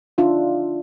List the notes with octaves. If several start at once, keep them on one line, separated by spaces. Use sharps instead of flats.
D4 D#4 F4 E5